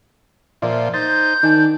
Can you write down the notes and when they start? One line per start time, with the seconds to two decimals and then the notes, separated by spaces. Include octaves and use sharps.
0.62 A#2 F3 A#4 D5 E5
0.94 D#4 C5 G6 A6
1.43 D#3 D4 D#4 G#5